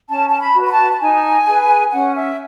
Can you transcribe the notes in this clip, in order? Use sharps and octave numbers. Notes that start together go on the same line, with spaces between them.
C#4 A5
A5
B5
F#4
B4
B5
A5
A5
D#4 G#5
G#4 B4
C#4 F#5
E5